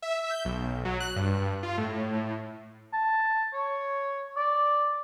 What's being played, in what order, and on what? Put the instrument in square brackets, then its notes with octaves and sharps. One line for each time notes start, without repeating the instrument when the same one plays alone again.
[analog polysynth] E5
G6
B1
F#3
F#6
G2
F4
A2
[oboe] A5
C#5
D5